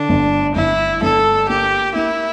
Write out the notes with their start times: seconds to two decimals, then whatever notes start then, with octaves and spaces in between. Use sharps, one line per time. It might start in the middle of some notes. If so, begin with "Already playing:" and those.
Already playing: D3 D4
0.09 G1
0.55 G1 E4
1.02 G1 A4
1.49 A#3 G4
1.95 A#3 E4